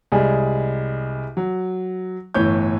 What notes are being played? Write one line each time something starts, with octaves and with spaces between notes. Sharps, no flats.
C2 G3 G#3 G#4
F#3
G1 A2 E3 C#5 G6